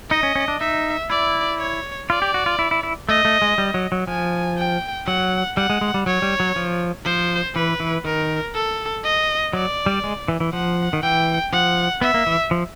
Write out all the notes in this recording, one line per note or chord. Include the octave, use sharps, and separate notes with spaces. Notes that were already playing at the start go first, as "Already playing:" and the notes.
D#4 D#5
C#4
C#4
D4
D#4 E5
E4 D5
C#5
F4 D5
G4
F#4
F4
E4
E4
E4
A3 D#5
A3
G#3
G3
F#3
F#3
F3 G#5
G5
F#3 F#5
G3 F#5
G#3
G#3
G3
F#3 C#5
G3
F#3
F3
F3 C5
E3 B4
E3
D#3 A#4
A4
D#5
F#3 D5
G3
G#3
E3
E3
F3 F#5
D#3
E3 G5
F3 F#5
B3 E5
A#3
E3
F3